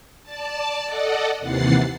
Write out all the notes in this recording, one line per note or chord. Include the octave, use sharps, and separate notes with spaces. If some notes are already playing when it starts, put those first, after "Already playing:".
D5 A5
A4 D5 D#5 F#5
D#2 C3 E3 F#5 A6 C7